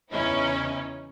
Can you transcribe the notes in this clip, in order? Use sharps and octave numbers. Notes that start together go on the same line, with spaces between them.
E2 C#3 C#4 D#4 E4